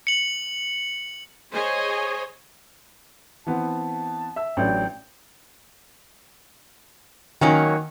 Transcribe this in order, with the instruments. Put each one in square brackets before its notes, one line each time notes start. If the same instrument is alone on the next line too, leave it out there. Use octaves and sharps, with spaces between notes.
[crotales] C#7 F#7
[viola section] G#4 C5 C#5 D#5 G#5
[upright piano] E3 B3 C4 [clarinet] A5
[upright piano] E5 E6
[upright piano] A1 F#3 D4 [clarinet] G5
[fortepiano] D#3 [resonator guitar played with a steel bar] F#3 A#3 C#4